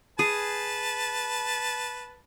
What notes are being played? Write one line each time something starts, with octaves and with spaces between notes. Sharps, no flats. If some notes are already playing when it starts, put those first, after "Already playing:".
G#4 B4 A5